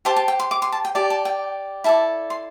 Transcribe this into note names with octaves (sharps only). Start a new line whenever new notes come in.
G4 C5 A5
A5
G5
C6
D6
C6
A5
G5
G4 D5 A5
A5
G5
E4 A4 D5 A5
C6